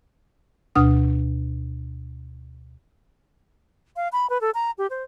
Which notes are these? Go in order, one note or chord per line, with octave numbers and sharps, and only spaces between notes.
D2 B2 D4 F#5 D#6 F6
F5
B5
B4
A4
A#5
G4
C5